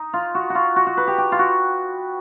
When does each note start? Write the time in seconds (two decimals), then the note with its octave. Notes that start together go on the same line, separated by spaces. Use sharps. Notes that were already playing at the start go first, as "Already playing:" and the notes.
Already playing: D#4
0.13 F4
0.35 F#4
0.50 F#4
0.55 F4
0.76 F#4
0.87 F#4
0.97 B4
1.07 G4
1.18 G4
1.32 F4
1.39 F#4